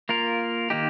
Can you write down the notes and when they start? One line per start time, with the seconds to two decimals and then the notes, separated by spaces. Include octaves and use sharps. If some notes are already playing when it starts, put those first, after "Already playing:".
0.09 A#3 F4 A#4
0.70 D#3 A#3 D#4 G4